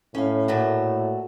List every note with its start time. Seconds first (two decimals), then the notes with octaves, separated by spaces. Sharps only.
0.15 A2 C#4 F5
0.48 A#2 A3 F#4